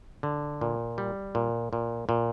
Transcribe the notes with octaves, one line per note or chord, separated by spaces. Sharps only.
D3
A#2
G3
A#2
A#2
A#2